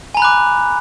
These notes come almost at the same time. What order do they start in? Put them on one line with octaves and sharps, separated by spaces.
G#5 A#5 B5 F#6 D6